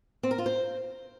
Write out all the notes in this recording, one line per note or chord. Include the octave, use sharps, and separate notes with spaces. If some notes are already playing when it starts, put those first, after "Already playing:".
C4
A#4
F4
C5